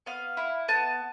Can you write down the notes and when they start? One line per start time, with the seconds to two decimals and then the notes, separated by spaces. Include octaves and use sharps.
0.06 B3 F5
0.37 E4
0.68 B3 A5